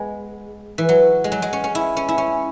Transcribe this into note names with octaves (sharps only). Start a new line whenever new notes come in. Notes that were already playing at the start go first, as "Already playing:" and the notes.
Already playing: G#3 B3
E3
F#3
G#3
F#3
G#3
C#4
C#4
E4
C#4
E4
C#4